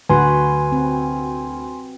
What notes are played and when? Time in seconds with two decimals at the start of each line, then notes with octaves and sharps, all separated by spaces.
0.09 D2 F#4 B4 G#5 C6
0.72 C4